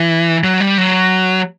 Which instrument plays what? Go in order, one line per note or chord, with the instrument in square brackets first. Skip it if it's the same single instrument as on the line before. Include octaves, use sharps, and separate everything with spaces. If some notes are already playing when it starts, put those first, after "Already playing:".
Already playing: [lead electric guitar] E3
F#3
G3
F#3